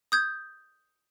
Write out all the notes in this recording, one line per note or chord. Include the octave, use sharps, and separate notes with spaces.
D#6 G6 G#6